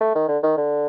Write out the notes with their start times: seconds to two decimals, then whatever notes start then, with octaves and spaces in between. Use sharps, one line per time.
0.01 A3
0.15 D#3
0.28 D3
0.43 D#3
0.57 D3